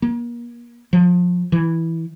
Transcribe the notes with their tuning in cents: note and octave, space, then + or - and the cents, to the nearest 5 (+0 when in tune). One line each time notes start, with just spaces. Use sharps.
A#3 +35
F3 +30
E3 -5